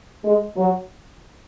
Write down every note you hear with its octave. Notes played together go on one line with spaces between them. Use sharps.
G#3
F#3